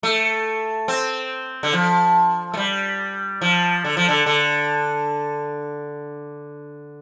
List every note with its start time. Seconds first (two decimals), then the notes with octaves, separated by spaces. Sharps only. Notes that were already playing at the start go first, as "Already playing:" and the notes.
0.03 A3
0.88 C4
1.63 D3
1.73 F3
2.54 A3
2.57 G3
3.41 F3
3.85 D3
3.97 F3
4.09 D3
4.26 D3